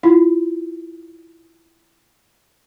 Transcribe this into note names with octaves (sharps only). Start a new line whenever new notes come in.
E4 F4